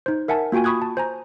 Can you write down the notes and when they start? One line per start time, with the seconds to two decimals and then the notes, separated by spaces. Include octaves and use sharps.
0.06 D#4 C5
0.28 A#4 E5 F#5 G#5 A5
0.52 A#3 F4 F#4 G5 G#5
0.64 B5 C#6 D#6 F#6 G#6
0.82 A5
0.97 C5 G#5 A#5